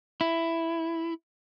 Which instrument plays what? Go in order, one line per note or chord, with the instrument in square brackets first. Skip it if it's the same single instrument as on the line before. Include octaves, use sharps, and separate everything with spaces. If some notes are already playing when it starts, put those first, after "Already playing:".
[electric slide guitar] E4